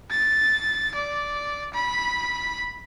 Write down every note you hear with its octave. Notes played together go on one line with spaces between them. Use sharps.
A6
D5
B5